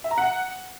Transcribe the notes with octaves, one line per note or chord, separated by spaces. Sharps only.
E5
A#5
F#5